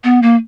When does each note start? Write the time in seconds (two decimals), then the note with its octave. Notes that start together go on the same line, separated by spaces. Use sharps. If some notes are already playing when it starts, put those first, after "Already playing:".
0.04 B3
0.22 A#3